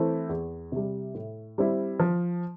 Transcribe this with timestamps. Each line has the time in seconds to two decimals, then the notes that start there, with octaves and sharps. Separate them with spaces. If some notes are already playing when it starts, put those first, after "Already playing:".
Already playing: E3 A3 C4 E4
0.29 E2
0.72 C3 G3
1.15 A2
1.58 G3 C4 E4
2.00 F3